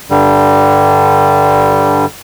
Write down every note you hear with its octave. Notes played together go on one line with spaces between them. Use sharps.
G2 D3 G3